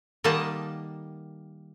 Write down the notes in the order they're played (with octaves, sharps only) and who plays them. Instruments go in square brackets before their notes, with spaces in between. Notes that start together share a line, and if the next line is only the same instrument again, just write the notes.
[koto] D#3 G3 A#3 D#5 F#5 A5